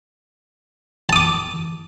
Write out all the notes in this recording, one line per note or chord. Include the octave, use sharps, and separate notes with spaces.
A5 D6 D#6